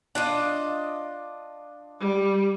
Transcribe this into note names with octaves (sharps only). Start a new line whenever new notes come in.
D4 F4 D#5
G3